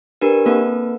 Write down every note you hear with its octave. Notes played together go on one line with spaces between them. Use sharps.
D4 G4 A#4 B4
A#3 C4 A4 B4